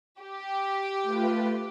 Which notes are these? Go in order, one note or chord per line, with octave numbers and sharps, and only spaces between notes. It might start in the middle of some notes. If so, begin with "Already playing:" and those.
G4
A3 F4 B4